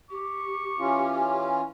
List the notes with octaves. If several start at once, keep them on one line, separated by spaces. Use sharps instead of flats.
G4 C#6
E3 C#4 F4